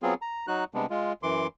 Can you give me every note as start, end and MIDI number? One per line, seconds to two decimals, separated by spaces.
0.03 0.14 54
0.03 0.14 59
0.03 0.14 60
0.03 0.14 65
0.03 0.14 68
0.22 0.46 82
0.47 0.64 54
0.47 0.64 63
0.47 0.64 66
0.47 0.64 90
0.74 0.86 48
0.74 0.86 55
0.74 0.86 56
0.74 0.86 59
0.74 0.86 62
0.90 1.13 56
0.90 1.13 65
1.23 1.47 42
1.23 1.47 52
1.23 1.47 84
1.23 1.47 86